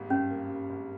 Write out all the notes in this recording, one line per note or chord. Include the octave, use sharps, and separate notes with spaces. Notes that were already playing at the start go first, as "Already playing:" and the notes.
Already playing: G#1 G2 G3 A#3
G2 C#4
A#3
G3
G#1